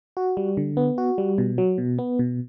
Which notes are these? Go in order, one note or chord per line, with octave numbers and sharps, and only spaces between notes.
F#4
G3
D3
B3
F#4
G3
B2
F#3
B2
B3
B2